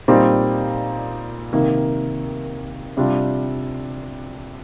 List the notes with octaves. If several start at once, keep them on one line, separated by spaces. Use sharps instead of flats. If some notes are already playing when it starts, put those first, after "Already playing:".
A#2 G3 C4 D#4
C3 D#3 A#3
C3 G3 D4 F4